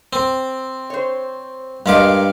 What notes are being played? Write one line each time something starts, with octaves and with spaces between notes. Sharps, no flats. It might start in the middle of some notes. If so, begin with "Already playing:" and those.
C4
C5 C#5
G2 G#3 A#4 D#5 F5 D6